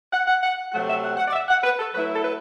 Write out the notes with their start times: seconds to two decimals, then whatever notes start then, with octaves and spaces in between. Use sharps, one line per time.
0.13 F#5
0.27 F#5
0.43 F#5
0.72 C3 F#3 A3 F#5
0.88 E5
1.03 F#5
1.17 F#5
1.28 D5
1.33 E5
1.49 F#5
1.63 B4
1.79 A4
1.94 F#3 A3 E4 B4
2.16 A4
2.25 B4